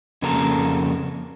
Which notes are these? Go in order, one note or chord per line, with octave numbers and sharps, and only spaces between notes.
F2 C#3 A#3 F#4 A4 A#5